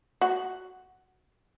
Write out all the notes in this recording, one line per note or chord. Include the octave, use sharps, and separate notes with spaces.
F#4